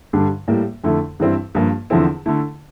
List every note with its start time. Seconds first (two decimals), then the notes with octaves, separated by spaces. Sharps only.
0.13 G2 D3 G3 D4
0.48 A2 G3 A#3
0.84 F2 D3 A3 E4
1.20 G2 E3 G3 C4 E4
1.55 G2 F3 A#3
1.90 E2 D3 F3 C4 E4
2.26 D3 A3 E4